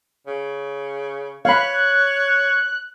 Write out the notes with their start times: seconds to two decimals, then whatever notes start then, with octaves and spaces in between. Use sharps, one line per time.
0.27 C#3
1.45 C#5 F5 B5 F#6